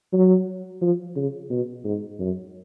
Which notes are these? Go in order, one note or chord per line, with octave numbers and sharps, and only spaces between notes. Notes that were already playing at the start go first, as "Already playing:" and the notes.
F#3
F3
C#3
B2
G#2
F#2